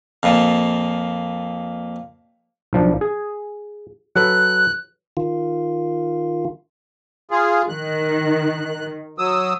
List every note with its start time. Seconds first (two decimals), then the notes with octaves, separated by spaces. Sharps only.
0.23 F2 A#2
2.73 B1 F3 D4
3.01 G#4
4.16 F#3 A4 B4 F#6
5.17 D#3 F4
7.31 F4 G#4
7.69 D#3 F#6
9.18 F#3 D#6 E6